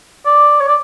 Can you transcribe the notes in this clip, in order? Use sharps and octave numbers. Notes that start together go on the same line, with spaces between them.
D5
C#5
D5